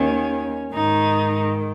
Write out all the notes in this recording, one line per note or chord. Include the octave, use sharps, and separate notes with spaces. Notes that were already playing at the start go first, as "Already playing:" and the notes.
Already playing: D#2 D#3 C#4
G#2 D#3 D#4